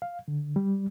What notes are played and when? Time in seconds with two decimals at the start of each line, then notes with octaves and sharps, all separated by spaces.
0.02 F5
0.28 D3
0.56 G3